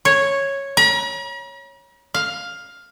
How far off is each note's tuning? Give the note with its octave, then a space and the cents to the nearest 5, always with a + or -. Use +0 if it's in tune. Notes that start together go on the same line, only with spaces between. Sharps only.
C#5 -5
A#5 +45
F5 +10